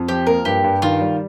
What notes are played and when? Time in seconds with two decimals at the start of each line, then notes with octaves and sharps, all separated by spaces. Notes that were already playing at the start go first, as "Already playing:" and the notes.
Already playing: F2
0.08 F3 G4
0.27 A#3 A#4
0.45 G2 G4
0.64 G2
0.82 D#3 F4
1.01 G3